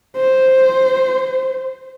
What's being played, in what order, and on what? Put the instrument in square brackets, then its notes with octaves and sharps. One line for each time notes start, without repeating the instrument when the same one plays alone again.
[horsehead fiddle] C5